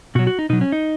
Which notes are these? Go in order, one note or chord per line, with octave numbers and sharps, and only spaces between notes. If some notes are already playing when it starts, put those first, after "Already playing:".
B2 F#3 F#4
F#4
D#4
B2 F#3 D#4
C#4
D#4